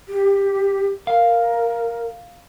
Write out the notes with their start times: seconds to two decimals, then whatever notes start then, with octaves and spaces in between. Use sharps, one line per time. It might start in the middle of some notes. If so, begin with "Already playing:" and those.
0.09 G4
1.07 A#4 F5